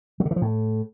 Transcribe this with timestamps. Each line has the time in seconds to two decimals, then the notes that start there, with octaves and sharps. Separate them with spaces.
0.20 F#3
0.25 D3
0.31 E3
0.36 F3
0.42 A2